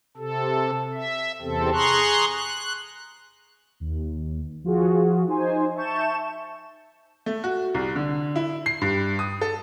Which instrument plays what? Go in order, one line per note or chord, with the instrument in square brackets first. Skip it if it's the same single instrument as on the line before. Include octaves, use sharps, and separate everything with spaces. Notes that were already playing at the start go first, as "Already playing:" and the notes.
[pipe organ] C3 A4
E5
E2 C3 C4 A4
G#4 A#5 C6 C#6 F#6
F#6
[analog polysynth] D#2
F3 F4 F#4 G#4
D#4 C5 G#5
E5 A5 C#6 G6 E7
[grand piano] A3
F#4
C2
D3
E4
C7
G2
D#6
A4